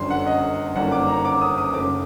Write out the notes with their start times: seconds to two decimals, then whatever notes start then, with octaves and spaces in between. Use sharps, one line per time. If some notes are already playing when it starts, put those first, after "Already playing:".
Already playing: G1 F#2 D3 G3 C6
0.10 F#5
0.26 D#5
0.76 G1 F#2 D#3 G3 A#3 F#5
0.92 D6
1.08 A#5
1.25 D6
1.41 D#6
1.58 D#6
1.74 F#1 F#2 D#3 A3 D6